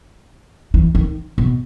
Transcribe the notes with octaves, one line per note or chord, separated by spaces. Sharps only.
E3
D#3
B2